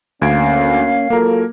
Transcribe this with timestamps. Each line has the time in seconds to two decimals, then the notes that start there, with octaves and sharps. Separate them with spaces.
0.22 D2 A#3 C#4 F5 G#6 D7
1.10 F#3 A#3 F4 A4 A#4